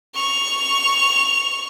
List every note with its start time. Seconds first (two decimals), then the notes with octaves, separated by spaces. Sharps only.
0.15 C#6 F7